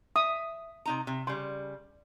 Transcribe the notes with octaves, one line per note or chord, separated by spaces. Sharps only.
E5 D#6
C3 D#4 A#5
C3
C#3 G3 C6